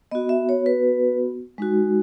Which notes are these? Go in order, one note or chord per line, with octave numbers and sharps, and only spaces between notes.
B3 F#4 D#5
E5
C#5
B4
G#3 D#4 F#4